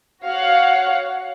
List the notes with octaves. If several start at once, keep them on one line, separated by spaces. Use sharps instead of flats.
F#4 C#5 F5 F#5